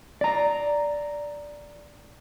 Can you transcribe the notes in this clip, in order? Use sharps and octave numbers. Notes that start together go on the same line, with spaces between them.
D5 A#5